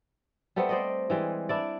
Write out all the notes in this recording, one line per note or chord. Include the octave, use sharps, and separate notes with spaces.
G3 A3 B3 C4
C5 D5 D#5
E3 G3 G#3
D4 E4 D5